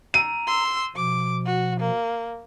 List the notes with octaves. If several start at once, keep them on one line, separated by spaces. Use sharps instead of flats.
A#5 D#7
C6 E6
B2 F3 D6
F#4
A#3